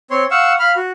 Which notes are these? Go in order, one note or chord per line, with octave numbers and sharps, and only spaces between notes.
C4 C#5 C6
F5 F#5 C#6 E6
F5 B5 F6
F#4